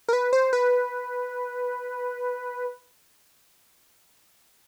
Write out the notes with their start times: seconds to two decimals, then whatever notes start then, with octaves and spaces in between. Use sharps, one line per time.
0.09 A#4
0.13 B4
0.33 C5
0.53 B4